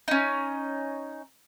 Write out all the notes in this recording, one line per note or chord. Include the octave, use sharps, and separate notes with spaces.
C#4 D#4